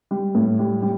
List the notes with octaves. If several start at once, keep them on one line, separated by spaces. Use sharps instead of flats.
G3
A2
G3
G3